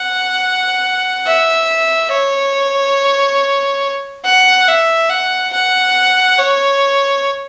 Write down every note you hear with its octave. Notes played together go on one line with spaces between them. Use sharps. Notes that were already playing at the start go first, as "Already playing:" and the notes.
Already playing: F#5
E5
C#5
F#5
E5
F#5
F#5
C#5